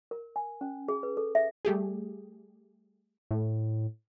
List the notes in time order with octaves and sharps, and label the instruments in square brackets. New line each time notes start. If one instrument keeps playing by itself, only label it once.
[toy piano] A#4
G#5
C#4
G#4
B4
A4
E5
[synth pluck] G3 A3 G4 G#4
[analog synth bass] A2